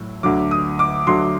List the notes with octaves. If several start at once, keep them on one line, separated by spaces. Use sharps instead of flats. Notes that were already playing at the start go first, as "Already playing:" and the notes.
Already playing: A2 F#3
D2 D3 F#3 D6
D#6
D6
D2 D3 F#3 C6